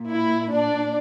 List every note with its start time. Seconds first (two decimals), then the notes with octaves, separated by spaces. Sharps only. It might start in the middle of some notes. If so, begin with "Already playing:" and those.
Already playing: A#2
0.12 E4
0.52 D4 D5